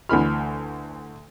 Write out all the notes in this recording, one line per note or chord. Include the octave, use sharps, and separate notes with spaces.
D2 E3 B5 F6